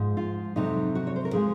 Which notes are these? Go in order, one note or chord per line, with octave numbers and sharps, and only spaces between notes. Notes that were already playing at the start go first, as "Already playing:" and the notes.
Already playing: G#2 F3 G#3
F4
F2 C3 F#3 D#4
F#4
C#5
C5
A#4
F3 G#3 G#4